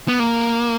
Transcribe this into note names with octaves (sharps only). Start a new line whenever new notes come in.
B3
A#3